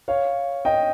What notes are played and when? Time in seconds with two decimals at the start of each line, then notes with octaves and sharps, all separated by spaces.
0.08 C#5 F5
0.65 D#5 G5